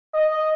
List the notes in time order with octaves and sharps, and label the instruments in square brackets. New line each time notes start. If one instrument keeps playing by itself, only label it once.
[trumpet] D#5